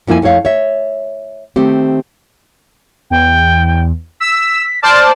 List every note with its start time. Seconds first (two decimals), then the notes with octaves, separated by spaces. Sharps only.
0.07 F2 F3 A#3 E4 G#5
0.22 F2 A3 E4 C#5 F5
0.45 C#5 E5
1.56 D#3 A3 C4 G4
3.10 E2 G5
4.20 E6 B6
4.82 C5 D5 A5 F6